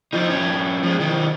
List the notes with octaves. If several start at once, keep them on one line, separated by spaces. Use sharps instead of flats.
F3 D#4
G2 C#4
F3 G#3
D#3 F#3